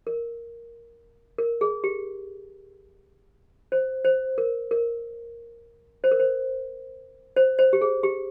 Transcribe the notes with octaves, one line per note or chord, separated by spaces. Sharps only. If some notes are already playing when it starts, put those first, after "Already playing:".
A#4
A#4
G#4
G4
C5
C5
A#4
A#4
C5
A#4
C5
C5
C5
G4
G#4
G4